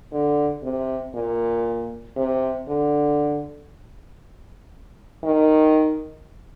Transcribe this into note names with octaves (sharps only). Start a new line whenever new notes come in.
D3
C3
A#2
C3
D3
D#3